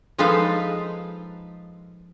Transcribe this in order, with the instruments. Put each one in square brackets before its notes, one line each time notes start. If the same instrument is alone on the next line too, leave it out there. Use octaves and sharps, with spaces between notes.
[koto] F3 G#3 D#4 A4 B4 F5